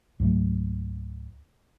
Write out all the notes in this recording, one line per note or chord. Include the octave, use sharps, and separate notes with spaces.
C#2 G#2 F#3 A3